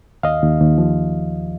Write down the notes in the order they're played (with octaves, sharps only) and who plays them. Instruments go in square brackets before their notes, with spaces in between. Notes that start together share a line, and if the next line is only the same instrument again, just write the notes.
[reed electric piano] D#2 D#5 F5
D#2
D#2
F3